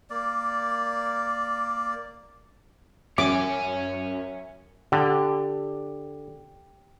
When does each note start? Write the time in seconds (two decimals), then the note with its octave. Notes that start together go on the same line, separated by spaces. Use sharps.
0.10 A#3 D5
3.18 F#2 C#5 E5 G#5 D6
4.92 D3 G4